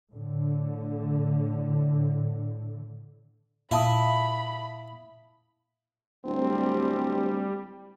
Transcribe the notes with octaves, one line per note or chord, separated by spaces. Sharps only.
A2 D3
A#2 E4 F5 A5 B5 D#6
D1 G3 C4